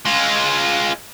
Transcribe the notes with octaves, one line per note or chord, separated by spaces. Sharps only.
G#3 F4